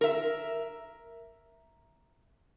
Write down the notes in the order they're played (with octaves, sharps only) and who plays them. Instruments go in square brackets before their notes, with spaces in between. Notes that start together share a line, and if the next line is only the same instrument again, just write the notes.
[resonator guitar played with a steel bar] A#4 E5